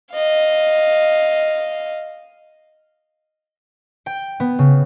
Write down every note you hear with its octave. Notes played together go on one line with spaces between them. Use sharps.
D#5 F5
G5
B3
C#3